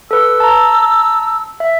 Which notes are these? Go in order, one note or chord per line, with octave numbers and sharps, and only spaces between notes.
A4 B4 E6
A5 A#5
E5